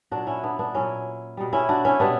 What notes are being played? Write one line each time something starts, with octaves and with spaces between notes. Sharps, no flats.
A#2 F#3 D4 F#4
C#4 E4
B3 D4
B3 D4
A#2 F#3 C#4 E4
B2 G3
C#4 E4
D4 F#4
C#4 E4
B2 G3 B3 D4